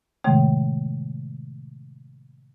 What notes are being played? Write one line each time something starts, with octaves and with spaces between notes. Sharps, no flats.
A2 C3 D#3 G#3 A3